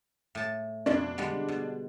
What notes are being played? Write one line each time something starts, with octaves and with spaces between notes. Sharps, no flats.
A2 A5
F2 B2 C#4 D4
D3 G3 G#3
B2